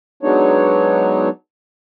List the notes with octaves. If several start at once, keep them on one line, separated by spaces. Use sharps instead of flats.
F#3 G#3 B3 D4 D#4 C#5